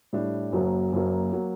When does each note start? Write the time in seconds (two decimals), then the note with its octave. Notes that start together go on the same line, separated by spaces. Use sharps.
0.13 A2 G3 D4 G4
0.52 F#1 F#2 F#3 A#3
0.92 F#1 F#2 F#3 A#3
1.33 F#3 A#3